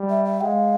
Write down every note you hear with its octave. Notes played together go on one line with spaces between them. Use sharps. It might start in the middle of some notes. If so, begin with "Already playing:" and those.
Already playing: G3
E5
E5
G#3 F5 G5